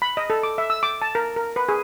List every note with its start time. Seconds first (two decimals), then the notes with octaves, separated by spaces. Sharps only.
0.02 B5
0.17 D#5
0.30 A4
0.43 D6
0.58 E5
0.70 E6
0.83 D6
1.02 A5
1.15 A#4
1.36 A#4
1.56 B4
1.69 G#4